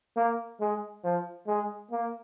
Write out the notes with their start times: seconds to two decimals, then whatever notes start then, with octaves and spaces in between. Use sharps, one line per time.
0.17 A#3
0.60 G#3
1.04 F3
1.47 G#3
1.91 A#3